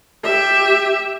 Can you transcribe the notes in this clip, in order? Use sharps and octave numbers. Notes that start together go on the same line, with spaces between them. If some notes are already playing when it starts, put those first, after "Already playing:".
G4 E5